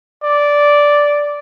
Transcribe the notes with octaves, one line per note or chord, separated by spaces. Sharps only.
D5